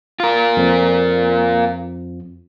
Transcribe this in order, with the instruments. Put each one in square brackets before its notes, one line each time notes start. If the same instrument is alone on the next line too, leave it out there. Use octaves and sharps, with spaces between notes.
[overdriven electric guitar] F4 A#4
[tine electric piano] F2 F3